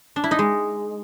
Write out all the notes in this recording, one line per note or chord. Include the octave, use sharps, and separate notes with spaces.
D4
E4
D#4
G#3